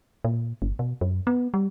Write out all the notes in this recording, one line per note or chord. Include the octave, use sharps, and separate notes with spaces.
A#2
G1
B2
F#2
B3
G3